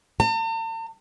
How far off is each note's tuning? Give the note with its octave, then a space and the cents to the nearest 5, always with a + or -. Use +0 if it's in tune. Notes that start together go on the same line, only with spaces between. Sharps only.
A5 +45